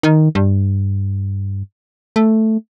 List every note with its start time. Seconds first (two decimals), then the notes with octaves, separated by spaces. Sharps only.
0.03 D#3
0.35 G2
2.16 A3